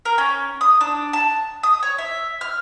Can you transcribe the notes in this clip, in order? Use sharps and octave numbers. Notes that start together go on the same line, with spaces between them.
A#4
C#4
D#6
D4
A5
D#6
C#5
E5
F6